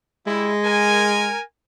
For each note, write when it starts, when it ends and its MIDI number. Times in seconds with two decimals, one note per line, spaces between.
0.27 0.50 55
0.27 1.35 56
0.27 0.50 64
0.64 1.41 70
0.64 1.41 80